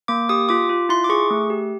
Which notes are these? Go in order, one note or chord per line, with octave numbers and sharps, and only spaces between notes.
A#3 D6
G4 D#6
F4 D6
F4
E4 C6
D6
G#4 C#6
A3
G4